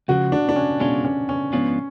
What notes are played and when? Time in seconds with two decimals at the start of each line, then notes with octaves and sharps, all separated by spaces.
0.08 C#2 C#3 F3 F#4
0.32 D4
0.49 D4
0.56 C#4
0.80 B2 G#3 C#4 D4 F4
1.05 C#4
1.29 C#4
1.53 G#2 F3 B3 C#4 D4 F4